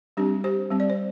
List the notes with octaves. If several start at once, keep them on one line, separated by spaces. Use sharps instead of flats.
G3 C4 D4 G4
G4 C5
G3 C4
D5
C5